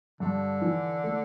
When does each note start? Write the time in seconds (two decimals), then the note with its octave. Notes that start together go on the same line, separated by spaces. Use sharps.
0.20 G2 D3
0.62 E3
1.04 A3